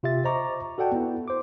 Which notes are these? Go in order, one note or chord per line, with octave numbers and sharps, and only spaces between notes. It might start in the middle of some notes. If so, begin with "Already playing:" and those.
C3 F4 G4 E5 A6
C5 D#5 A#5 C#6 D6
F#4 A4 D5 F#5 G5 A5
B3 E4
C5 D6